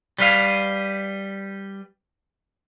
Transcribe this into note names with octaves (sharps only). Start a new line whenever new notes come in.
G3 B4 F5